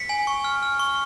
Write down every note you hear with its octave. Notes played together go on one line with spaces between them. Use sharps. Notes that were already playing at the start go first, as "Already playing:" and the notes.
Already playing: B6 C#7
G#5
C#6
F6
F6
C#6